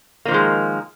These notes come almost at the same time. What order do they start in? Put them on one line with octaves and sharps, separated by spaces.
A#3 F3 D#3 G#3